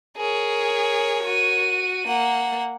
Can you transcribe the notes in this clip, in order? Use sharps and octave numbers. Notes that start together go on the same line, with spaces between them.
G#4 A#4 C#5
F#4 D#7
A#3 F#5